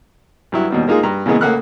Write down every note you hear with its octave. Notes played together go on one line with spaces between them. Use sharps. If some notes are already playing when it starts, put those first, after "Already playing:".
G2 F#3 E4
D#2 B2 G3
G#3 A#3 D#4 F4 G#4
G2 A#5
A#2 C#3 E3 G#3 B3 G#4
C#2 A3 A#3 F#5 F6 F#6